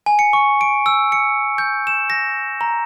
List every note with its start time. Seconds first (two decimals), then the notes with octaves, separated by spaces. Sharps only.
0.06 G#5
0.19 C#7
0.33 C#6
0.61 D7
0.86 E6
1.12 C#7
1.58 G6
1.87 E7
2.10 A#6
2.61 A#5